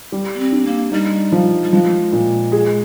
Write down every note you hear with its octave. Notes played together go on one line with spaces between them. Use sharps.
G3
A#3
C4
D4
A#3
G3 D#4
F3
G3
F3 G#3
A#2
G#4